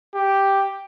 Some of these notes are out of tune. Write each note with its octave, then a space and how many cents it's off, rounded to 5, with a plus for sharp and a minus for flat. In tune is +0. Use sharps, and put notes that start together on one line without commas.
G4 +0